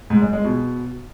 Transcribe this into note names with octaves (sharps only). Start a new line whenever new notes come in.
G#2
G#3
G#3
B2